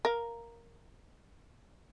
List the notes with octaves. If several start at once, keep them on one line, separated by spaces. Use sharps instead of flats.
A#4 F5